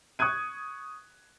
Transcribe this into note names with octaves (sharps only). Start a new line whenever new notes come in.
C#6 D#6 F#6 G#6 D#7